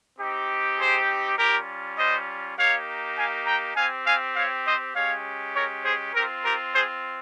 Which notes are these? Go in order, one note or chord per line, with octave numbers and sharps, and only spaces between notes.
C4 D#4 G4
G#4 C5
G3 C#4 F4 G4 A#4
C5 D#5
A#3 D#4 G4 C#5 F5
F5 G#5
G5 A#5
C4 G4 F5 G#5
F5 G#5
C#5 F5
C5 D#5
G#3 C#4 G4 C#5 F5
A#4 C#5
G#4 C5
C4 F4 G4 A#4
G4 A#4
G#4 C5